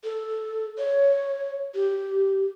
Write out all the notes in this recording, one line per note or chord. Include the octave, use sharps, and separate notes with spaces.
A4
C#5
G4